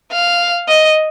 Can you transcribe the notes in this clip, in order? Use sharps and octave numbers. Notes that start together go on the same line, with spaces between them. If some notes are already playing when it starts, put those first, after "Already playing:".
F5
D#5